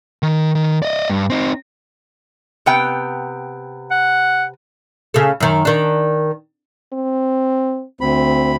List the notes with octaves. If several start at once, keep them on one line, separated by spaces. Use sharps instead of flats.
D#3
D#3
D5 D#5
G2
C4 D#4
C3 B3 G5
F#5
C#3 A4
F#2 D#3
D#3 D4
C4
D2 C4 B5